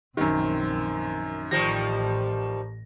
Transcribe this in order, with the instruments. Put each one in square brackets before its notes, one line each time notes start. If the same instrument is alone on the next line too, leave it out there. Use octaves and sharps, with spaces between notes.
[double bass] A#1 C4 [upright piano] F#2 D#3
[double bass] A1 [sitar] D#3 F3 G3 [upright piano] A#6